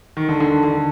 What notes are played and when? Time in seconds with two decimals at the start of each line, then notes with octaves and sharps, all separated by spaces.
0.17 D#3
0.29 D3
0.40 D3
0.63 D3